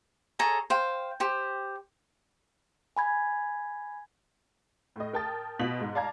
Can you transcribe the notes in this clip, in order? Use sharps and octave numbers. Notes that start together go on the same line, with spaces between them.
G#4 A4 C#5 A#5
C5 F5 G5
G4 C5
G#5 B5 G#6
A2 D#5
A#4 G5 A5 D#6 A6
B2 F4 B6 F#7
G#2
D5 F5 A5 A#5 G#6